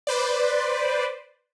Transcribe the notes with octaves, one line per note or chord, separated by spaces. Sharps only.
B4 C5 D5